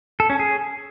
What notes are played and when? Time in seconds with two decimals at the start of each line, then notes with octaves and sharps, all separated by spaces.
0.20 A4
0.30 C#4
0.39 G#4